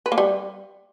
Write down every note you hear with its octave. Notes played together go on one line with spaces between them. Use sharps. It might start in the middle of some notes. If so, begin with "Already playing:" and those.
B4
A#3
G3